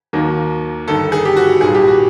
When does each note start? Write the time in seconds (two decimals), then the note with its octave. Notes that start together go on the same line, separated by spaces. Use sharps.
0.13 D#2 D#3 F#3 A#3
0.87 G1 G2 D#3 A4
1.12 G#4
1.25 G4
1.37 F#4
1.61 B1 A#2 G3 G#4
1.75 G4
1.88 F#4